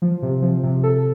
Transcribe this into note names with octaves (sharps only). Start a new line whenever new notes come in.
F3
C3
F3
C3
A4